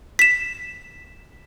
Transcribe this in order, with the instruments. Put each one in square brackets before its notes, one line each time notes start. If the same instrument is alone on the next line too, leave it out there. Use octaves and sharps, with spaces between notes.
[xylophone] B6 E7